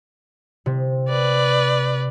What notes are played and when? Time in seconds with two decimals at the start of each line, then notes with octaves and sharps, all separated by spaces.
0.66 C3
1.09 B4 D5